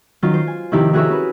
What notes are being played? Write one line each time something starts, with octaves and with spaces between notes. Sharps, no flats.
D#3 F#3 C#4 F4
C5
G#5
C3 D#3 F3 E4 G4
E4 F#4 G#4 A#4 C#5 E5
C#4 B4